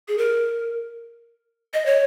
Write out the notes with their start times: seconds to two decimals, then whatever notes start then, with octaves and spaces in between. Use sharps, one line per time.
0.08 G#4
0.18 A#4
1.74 D#5
1.86 C#5